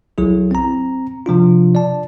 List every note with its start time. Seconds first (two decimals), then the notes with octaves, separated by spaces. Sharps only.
0.18 B1 F#3 E4 G#4
0.51 C4 A#5
1.26 C3 F3 D4 F4
1.75 D5 A5